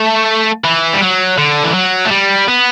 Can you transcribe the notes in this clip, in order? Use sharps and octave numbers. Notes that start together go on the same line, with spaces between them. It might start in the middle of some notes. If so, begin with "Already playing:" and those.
Already playing: A3
E3
G3
F#3
D3
E3
F#3
A3
G3
B3